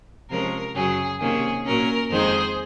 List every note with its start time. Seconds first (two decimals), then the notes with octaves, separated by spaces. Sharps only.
0.29 C3 F3 G#3 C#4 A#4
0.75 F#2 C#3 F#3 C#4 G#4
1.20 C3 D#3 A#3 C#4 G#4
1.65 A#2 F#3 C#4 A#4
2.10 F2 D#3 G#3 D#4 G#4 C5